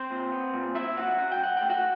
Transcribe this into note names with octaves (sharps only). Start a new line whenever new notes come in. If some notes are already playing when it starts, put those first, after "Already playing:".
Already playing: C4 C5
A#2
B3
A#2
F#3 E4 E5
F#2 F#4 F#5
F#2 F#5
G5
F#2 F#5
A3 G5
F#4 F#5